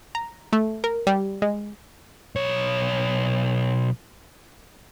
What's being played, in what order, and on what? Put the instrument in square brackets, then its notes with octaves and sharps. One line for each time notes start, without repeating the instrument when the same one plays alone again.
[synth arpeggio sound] A#5
A3
A#4
G3
G#3
[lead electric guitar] B1 C#5